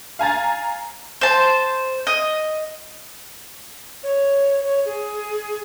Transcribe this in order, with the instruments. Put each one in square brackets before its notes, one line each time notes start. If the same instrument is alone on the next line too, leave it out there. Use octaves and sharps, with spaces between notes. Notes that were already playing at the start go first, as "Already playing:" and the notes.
[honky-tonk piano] F5 G#5 A#5 A6
[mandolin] C5 A5
D#5
[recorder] C#5
C#5
G#4